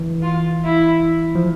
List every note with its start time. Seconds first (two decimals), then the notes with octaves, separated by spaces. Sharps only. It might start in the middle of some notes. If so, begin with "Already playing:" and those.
Already playing: E3
0.23 F4
0.65 E4
1.35 F3